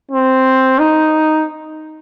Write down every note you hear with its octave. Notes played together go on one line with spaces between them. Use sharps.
C4
D#4